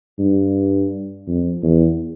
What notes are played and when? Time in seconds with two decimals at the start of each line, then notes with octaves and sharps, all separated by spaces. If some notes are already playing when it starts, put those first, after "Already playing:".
0.19 G2
1.28 F2
1.63 E2